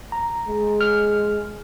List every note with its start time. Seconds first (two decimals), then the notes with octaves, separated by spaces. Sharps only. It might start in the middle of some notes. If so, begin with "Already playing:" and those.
0.12 A#5
0.48 G#3
0.81 F6